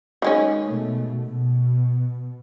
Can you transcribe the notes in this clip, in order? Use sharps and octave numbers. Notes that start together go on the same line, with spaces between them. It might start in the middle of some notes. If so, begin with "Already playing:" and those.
D#3 G#3 C#4
B2 A3
B2